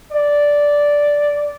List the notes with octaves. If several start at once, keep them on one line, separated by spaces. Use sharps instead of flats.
D5